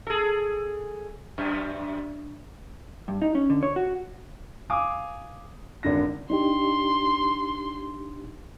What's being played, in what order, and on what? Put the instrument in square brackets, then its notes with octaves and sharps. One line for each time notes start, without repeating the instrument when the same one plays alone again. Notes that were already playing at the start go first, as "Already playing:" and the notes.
[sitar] G#4 A4
F#2
[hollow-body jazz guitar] G2
D#4
C#4
D3
C#5
F#4
[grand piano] F5 G#5 D6 D#6
G#1 D3 A#6
[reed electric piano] D4 D#4 G4 [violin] C6